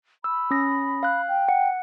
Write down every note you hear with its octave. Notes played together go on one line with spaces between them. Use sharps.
B5 E6
C#4 D#6 A#6
F5 F#6
G5
F#5